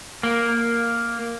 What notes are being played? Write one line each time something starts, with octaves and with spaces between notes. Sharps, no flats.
A#3